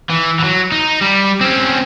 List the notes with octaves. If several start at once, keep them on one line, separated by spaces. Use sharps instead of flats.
E3
E3 F#3
D#4
G3
C4 C#4